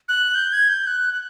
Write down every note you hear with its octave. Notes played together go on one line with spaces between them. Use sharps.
F#6
G6
G#6
G6
F#6
F#6